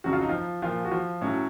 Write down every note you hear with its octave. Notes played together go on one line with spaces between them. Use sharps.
F2 C#3 F#3 F#4
F4
D#4
F3 F4
A#2 F3 F4
F#4
F3 F4
A2 F#3 C#4